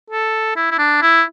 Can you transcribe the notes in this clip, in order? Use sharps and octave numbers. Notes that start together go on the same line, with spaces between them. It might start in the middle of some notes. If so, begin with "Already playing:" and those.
A4
E4
E4
D4
E4